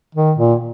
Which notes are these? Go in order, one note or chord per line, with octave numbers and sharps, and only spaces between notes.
D#3
A#2